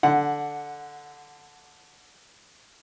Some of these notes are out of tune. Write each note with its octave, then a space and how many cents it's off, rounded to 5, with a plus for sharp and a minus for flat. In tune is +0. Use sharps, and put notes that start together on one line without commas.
D3 +0 F#5 +0